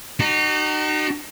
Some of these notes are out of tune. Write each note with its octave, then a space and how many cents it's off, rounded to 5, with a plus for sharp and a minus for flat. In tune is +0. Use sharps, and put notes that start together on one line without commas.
D#4 -30 F#4 +40